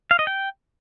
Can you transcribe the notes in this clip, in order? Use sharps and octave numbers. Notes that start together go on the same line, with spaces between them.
F5
D#5
G5